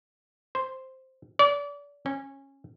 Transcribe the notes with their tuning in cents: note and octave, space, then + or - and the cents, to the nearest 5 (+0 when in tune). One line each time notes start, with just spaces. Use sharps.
C5 +0
D5 -35
C#4 -20